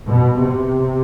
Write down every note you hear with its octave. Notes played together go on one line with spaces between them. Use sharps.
B2
C3